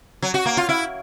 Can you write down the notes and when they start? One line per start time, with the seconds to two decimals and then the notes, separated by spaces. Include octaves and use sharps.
0.22 F#3
0.34 F#4
0.46 A#3
0.57 F4
0.69 E4